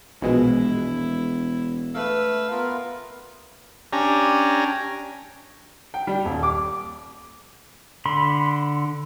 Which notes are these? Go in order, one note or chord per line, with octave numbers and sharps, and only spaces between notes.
E1 A#1 B2 G#3 E4
A3 B4 F5 E6
B3 F4 A#4
C#4 D4 G4 G#5 A#5
G5
G3
D#1
D6
D3 B5 C6